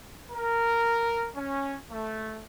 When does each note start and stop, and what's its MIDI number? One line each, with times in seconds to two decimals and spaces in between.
0.32 1.30 70
1.36 1.75 61
1.91 2.45 57